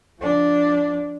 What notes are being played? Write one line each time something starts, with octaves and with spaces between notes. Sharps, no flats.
F3 D4